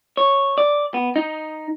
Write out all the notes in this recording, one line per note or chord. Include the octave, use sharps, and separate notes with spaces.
C#5
D5
B3
D#4